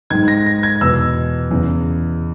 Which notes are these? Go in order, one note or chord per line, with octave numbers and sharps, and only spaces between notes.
G#2 D#3 G#6
A#6
A#6
G#6
E2 B2 E6
E2 C#3 E3